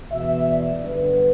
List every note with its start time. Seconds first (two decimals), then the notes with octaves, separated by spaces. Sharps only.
0.12 E2 B2 B3 E5
0.48 D5
0.84 G2 D3 G3 B3 B4